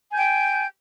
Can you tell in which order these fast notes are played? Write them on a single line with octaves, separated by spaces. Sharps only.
G#5 G6 G5